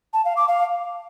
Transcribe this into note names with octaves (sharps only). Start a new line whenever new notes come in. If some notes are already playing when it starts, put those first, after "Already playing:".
A5
F5
D6
F5